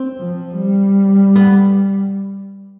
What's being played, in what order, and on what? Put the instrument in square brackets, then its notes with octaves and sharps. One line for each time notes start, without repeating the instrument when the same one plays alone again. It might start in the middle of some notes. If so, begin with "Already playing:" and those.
Already playing: [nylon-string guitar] C4
[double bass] F3
G3
[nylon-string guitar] B3